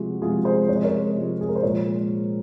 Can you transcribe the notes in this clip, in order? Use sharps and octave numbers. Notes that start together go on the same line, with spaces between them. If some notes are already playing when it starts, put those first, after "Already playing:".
Already playing: C3 F3 G#3 F#4
C3 F3 G#3 F4 G#4
G#4 C5
C3 F3 G#3 C#5
D#5
A#4 C#5
C3 F3 G#3
G#4
A#4
C5
A#2 F3 G#3 A#4 C#5